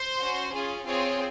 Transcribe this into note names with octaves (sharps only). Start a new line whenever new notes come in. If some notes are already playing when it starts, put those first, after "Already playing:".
Already playing: C5
C#4 F#4
C#4 F4 G#4
C4 F4 G#4 C#5